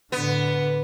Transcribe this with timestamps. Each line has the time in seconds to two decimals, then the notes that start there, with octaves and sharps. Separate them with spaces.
0.12 A2 D3 B3